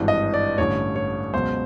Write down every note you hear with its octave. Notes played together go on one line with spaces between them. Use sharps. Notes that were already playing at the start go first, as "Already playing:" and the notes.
Already playing: G#1 G2 E3
D#5
D5
A1 G2 D3 C#5
C#5
C#2 B2 F#3 C5